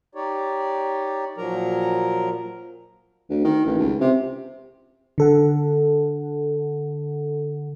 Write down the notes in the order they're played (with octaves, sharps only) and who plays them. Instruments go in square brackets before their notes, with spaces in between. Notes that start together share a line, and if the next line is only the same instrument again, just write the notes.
[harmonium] D#4 G4 C#5 D5
A#2 F3 F#3 A#4 A#5
[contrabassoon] D2
D#3
A1
C#2
C3
[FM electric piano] D3 A4 F#5